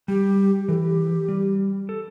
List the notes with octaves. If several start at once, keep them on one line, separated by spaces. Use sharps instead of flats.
G3 G4
E3 A4
G4
G3
A4